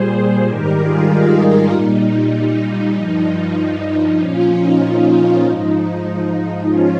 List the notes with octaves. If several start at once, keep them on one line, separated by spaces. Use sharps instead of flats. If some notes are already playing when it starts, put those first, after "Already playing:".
Already playing: A#2 G3 G#4 C5
G#2 D#3 G3 G4 A#4
F4 G#4
D#4
A#2 G3
D#4
G2 F3
A#2 F3 C#4 F4
D#4
G#2 F3 D#4
G#2 F3 C#4 F4